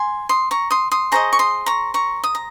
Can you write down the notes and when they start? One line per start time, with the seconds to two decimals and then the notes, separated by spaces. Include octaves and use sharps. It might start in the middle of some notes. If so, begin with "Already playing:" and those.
Already playing: G#5 C6
0.29 C6 D#6
0.51 A#5 C#6
0.71 C6 D#6
0.91 C6 D#6
1.12 G#4 C5 D#5 A#5 C#6
1.33 C#6
1.39 C6 D#6
1.66 A#5 C#6
1.94 A#5 C#6
2.24 D#6
2.35 A#5